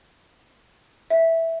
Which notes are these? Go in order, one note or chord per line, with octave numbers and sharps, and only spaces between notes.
E5